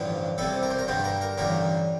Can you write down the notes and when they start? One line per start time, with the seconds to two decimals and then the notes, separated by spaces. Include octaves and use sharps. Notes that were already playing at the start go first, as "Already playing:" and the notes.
Already playing: A1 G2 D3 F3
0.38 C2 C3 G3 A4
0.63 A#4
0.70 C5
0.79 A#4
0.87 G2 D3 G3 C5
1.04 A#4
1.21 A#4
1.38 A1 G2 D3 G3 A#4